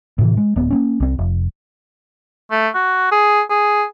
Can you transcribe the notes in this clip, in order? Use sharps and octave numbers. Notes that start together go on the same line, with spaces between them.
A2 C3 E3
G#3
D1 B3
A#3 C4 C#4
C2 C4
F1
A3
F#4
G#4
G#4